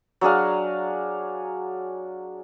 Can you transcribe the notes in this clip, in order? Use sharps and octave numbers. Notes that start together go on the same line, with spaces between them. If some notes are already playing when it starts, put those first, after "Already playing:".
F#3 D4 G#4 F5